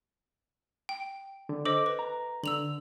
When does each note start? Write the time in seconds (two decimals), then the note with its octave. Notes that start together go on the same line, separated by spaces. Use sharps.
0.89 G5
1.49 D3
1.65 A4 C5 D#5 D6
1.86 B4
1.99 A#5
2.44 D3 E6 F7 F#7